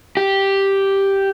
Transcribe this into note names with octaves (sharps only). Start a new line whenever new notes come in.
G4